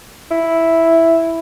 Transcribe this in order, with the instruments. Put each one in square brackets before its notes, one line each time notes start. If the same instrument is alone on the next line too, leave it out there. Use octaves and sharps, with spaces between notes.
[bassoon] E4